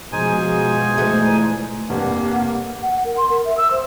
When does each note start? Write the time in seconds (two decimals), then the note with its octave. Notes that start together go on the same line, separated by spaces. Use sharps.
0.12 B2 F3 G#3 D#4 G#4 C5 G#5
0.98 D2 E3 A3
1.89 F1 G2 A#3 B4 F#5
2.82 F#5
3.05 A#4
3.17 C6
3.30 A#4
3.45 E5
3.57 E6
3.71 C5